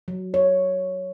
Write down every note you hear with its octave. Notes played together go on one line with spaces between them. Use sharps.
F#3
C#5